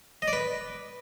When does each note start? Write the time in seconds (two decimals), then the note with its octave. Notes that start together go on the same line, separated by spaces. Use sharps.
0.22 D#5
0.28 D5
0.33 B4